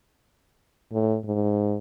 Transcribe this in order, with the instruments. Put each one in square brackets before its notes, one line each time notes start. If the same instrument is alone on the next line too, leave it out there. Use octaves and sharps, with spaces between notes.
[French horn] A2
G#2